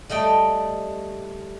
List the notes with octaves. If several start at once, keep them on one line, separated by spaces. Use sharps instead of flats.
G3 A3 D#5 G5